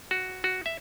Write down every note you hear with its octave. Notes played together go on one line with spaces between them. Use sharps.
F#4
F#4
E5